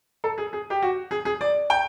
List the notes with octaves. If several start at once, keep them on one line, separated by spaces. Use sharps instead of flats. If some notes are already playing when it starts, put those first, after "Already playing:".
A4
G#4
G#4
G4
F#4
G#4
G#4
D5
G5